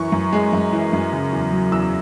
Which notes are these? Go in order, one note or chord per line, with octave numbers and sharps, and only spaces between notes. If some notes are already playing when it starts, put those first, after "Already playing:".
Already playing: F#2 E3 C#6
F#2
G#3
F#2
E3
F#2
C#3
E2
F#3
E2 E6